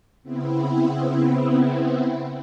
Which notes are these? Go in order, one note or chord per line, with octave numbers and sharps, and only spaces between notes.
C#3 B3 C4 E4